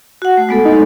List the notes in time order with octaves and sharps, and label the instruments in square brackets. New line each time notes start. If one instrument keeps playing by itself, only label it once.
[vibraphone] F#4 F#5
A3
G#3 B3 A4
[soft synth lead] D#4